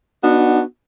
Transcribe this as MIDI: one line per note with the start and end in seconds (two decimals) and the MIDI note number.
0.24 0.61 59
0.24 0.61 62
0.24 0.61 63
0.24 0.61 66